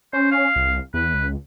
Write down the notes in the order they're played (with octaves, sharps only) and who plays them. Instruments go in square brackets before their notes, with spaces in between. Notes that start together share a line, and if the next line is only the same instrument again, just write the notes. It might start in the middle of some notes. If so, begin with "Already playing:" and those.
[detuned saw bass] C#4 [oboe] C5
[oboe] F5
[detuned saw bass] C2
[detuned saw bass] E2 [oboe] B4
[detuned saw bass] C#2